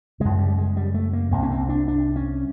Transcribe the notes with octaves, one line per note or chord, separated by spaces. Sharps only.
F#2 C#3 G#3
G3
G#3
G3
A3
A#3
C2 C3 A#3
C#4
C4
D4
D4
C#4